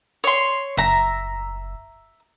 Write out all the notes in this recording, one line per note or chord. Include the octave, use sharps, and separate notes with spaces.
C#5 C6
F#1 E5 A#5